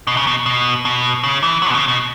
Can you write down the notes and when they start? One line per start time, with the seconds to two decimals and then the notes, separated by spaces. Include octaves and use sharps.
0.07 B2
0.17 C#3
0.27 B2
0.46 B2
0.85 B2
1.23 C#3
1.43 E3
1.62 F#3
1.70 B2
1.74 C#3
1.88 B2